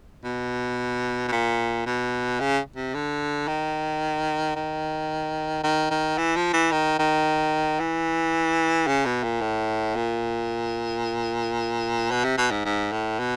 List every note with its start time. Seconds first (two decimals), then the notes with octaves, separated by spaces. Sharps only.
0.24 B2
1.28 B2
1.32 A#2
1.86 B2
2.40 C#3
2.76 C3
2.94 D3
3.48 D#3
4.56 D#3
5.63 D#3
5.91 D#3
6.18 E3
6.36 F3
6.53 E3
6.71 D#3
6.99 D#3
7.80 E3
8.87 C#3
9.05 B2
9.23 A#2
9.41 A2
9.96 A#2
12.11 B2
12.24 C3
12.38 B2
12.51 G#2
12.65 G#2
12.92 A2
13.19 B2